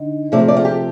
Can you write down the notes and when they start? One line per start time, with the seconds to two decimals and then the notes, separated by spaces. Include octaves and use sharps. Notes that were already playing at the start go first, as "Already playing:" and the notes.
Already playing: D3 D#4
0.32 C3 F3 A3 D5
0.48 D5
0.57 F4
0.65 G4